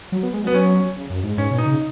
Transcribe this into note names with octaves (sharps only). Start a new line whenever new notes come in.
F#3
B3
G#3
F#3 B3
C#4
C#3
F#2
G#2
G#2 C#4
B2
D#4
C#3